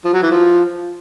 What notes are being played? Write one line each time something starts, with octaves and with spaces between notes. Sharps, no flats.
F3
F#3
E3
F3